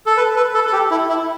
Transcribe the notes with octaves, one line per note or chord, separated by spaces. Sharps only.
A4
B4
B4
A4
A4
G4
E4
E4